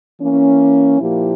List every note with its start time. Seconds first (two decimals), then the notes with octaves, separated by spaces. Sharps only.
0.20 E3 A#3 C#4
0.99 A#2 F3 A#3 E4 G4